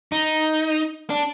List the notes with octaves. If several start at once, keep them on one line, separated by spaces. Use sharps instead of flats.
D#4
D4